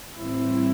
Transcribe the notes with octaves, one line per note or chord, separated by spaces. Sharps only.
A2 E3 G3 C4 E4